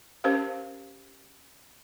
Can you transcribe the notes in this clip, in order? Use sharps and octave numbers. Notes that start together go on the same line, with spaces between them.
C#4 G4 A#4 C5 F5